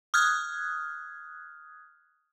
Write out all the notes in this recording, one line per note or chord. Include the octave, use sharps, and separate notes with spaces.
D#6 F6 F#6 G#6